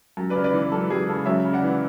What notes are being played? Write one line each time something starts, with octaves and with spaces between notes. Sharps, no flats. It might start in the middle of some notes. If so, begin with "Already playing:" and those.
F#2
B4 D5
C#3
B4 D5
E3
F#2 A4
F#2 G#4
C#3 A4
F#2 C#5 E5
C#3
D5 F#5
E3